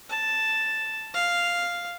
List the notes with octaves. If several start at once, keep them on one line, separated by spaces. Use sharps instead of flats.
A5
F5